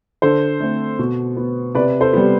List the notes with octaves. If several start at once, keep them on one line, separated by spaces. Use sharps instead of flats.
D3 A4 C5
A3 C4
B2
B3
C3 B4 D5
A4 C5
G3 B3